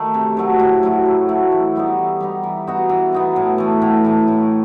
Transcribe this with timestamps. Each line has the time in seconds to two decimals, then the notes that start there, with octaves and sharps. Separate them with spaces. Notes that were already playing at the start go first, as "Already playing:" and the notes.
Already playing: D#3 A3
0.14 C3
0.37 D#3 F#3 A3
0.60 A2
0.83 F#3 A3 E4
1.06 A2
1.29 F#3 A3 E4
1.52 E3
1.76 G3 B3 D#4
1.98 E3
2.21 G3 B3 D#4
2.43 E3
2.67 B3 D#4 F#4
2.89 E3
3.12 B3 D#4 F#4
3.36 A2
3.58 E3 A3
3.82 A2
4.05 E3 A3
4.28 A2